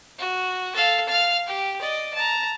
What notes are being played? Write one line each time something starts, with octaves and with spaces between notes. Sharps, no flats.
F#4
A4 F5
F5 F6
G4
D5 D#5
A5 A#5